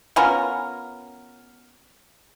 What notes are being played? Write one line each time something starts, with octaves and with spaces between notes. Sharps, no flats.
B3 C#4 F4 A#4